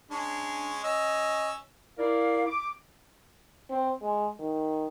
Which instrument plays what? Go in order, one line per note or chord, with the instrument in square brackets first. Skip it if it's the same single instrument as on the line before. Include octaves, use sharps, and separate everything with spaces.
[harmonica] G#3 C#4 [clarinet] D4
[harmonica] C#4 E6 [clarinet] D#5
[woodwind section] E4 A#4 D5 F5
D6
[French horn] C4
G#3
D#3